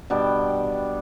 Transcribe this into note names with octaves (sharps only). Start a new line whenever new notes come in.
B2 G3 D4 G5